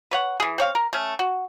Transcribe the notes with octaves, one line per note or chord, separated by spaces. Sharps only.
B4 C#5 F#5
E3 G#4
C4 C#5 F5
A#4
A3 C#4
F#4